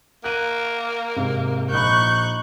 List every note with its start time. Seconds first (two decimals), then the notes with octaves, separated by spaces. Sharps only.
0.24 A#3 F#6 D#7
1.16 G#2 C3
1.72 A#1 D#4 B5 C#6 F#6 G6